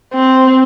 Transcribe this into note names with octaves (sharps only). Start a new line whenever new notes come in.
C4